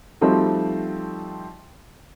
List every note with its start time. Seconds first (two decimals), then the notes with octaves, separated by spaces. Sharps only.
0.21 F3 G3 A3 C4 D#4 F#4